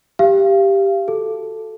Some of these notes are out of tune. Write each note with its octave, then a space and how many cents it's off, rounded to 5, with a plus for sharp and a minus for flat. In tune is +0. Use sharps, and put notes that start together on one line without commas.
G4 +0 F5 -30
F#4 +0 A4 +0